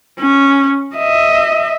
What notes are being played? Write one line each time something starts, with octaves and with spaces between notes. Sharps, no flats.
C#4
D#5 E5